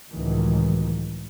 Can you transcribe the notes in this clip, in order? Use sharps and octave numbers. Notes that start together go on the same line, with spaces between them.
C#2 A2 D#3 E3 F#3